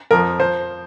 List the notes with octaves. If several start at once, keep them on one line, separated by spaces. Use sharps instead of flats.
F2 F3 A#4
F3 C5